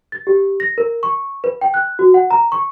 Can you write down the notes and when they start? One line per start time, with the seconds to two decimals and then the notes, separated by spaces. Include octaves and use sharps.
0.12 A6
0.27 G4
0.60 A#6
0.78 A#4
1.03 C#6
1.44 B4
1.61 G5
1.74 F#6
1.99 F#4
2.14 F#5
2.30 A#5
2.52 C#6